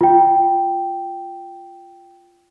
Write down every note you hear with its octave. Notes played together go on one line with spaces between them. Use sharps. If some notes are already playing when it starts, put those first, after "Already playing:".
F4 G5